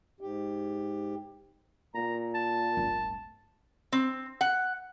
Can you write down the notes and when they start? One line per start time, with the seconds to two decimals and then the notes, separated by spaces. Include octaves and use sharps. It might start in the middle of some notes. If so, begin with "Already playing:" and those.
0.21 G#2 G4
1.95 A#2 A#5
2.34 A5
2.77 D1 G1
3.92 C4
4.41 F#5